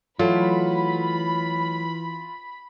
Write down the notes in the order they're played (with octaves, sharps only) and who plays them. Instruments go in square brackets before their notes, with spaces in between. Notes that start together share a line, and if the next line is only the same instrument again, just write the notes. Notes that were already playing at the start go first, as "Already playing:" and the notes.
[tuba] E3 [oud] F#3 A3 [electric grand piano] F4 [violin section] B5